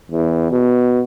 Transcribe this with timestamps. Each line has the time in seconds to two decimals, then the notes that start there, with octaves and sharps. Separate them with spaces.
0.11 E2
0.51 B2